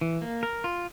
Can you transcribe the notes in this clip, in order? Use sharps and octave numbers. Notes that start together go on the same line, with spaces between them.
E3
A#3
A#4
F4